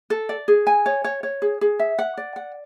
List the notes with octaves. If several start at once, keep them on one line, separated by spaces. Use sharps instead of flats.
A4
D5
G#4
G#5
C#5
C#5
C#5
G#4
G#4
E5
F#5
D5
F#5